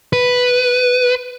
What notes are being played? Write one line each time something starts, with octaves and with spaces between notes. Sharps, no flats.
B4